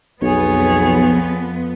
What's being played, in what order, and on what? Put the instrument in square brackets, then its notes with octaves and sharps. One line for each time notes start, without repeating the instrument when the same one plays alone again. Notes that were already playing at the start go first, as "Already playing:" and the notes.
[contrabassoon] B1 [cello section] F2 F3 B3 [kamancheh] G#4 C#5